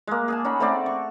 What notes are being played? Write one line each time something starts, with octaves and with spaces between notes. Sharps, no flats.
G#3 A#3
G#4 G#5 A5
C#4 D#4 F#5 B5
A3 C4 A4 D5
C#6